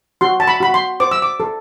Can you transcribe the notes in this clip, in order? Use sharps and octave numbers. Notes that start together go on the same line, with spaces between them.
F#4 C6
A5
B5
F#4 B5
C6
C5 D6
E6
D6
A4